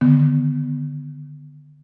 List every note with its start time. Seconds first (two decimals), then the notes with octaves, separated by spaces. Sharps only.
0.01 D3 D#3 B3